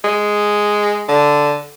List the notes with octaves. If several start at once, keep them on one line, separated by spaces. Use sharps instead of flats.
G#3
D3